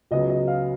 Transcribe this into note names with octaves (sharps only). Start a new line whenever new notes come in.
C#2 C#3 F#3 B3 D#5
D#5
F5